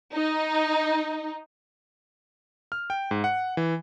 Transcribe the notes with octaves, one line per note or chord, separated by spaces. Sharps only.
D#4
F6
G5
G#2
F#5
E3